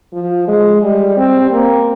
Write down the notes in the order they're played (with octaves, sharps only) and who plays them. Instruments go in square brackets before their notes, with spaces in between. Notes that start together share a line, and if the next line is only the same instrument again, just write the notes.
[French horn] F3
G#3
G3
C4
A#3